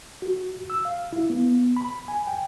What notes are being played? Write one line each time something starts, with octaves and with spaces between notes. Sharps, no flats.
F#4
E6
F5
E4
B3
B5
G#5
G5